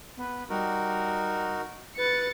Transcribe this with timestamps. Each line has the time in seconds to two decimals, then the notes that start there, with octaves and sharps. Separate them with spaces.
0.17 B3
0.50 G3 D#4 F#4 A#4
1.97 B4 A6 C#7